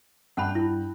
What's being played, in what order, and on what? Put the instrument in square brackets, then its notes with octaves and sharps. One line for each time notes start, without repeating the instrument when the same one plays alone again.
[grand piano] G2 G5 F#6 [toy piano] F#5 A5 B5
[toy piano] E4